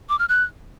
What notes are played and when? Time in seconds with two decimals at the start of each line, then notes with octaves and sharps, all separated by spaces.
0.09 D6
0.19 F6
0.29 F#6